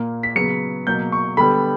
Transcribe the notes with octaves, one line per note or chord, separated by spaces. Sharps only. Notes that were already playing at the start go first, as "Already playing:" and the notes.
Already playing: A#2 A#3
B6
C#3 F#3 B3 C#7
B2 F#3 A#3 G6
C#6
D3 G3 B3 B5